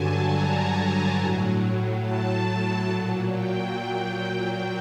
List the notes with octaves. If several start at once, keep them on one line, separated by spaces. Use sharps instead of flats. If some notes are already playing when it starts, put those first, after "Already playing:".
Already playing: G2 D3 F#3 G#5 A5
A#5
A2 F#3
A5
A#2 F#3
G5